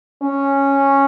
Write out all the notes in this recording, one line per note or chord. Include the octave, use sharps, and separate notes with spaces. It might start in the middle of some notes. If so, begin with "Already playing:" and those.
C#4